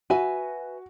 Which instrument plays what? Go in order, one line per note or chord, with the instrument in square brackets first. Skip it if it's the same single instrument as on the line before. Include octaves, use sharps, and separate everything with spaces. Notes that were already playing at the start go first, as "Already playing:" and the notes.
[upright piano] F#4 [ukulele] B4 E5 G#5